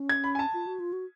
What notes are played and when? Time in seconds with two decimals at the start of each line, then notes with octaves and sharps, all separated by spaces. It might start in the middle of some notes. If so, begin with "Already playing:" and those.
Already playing: C#4
0.09 G#6
0.24 B5
0.35 G#5
0.39 A5
0.54 F4
0.67 F#4
0.80 F4
0.93 F#4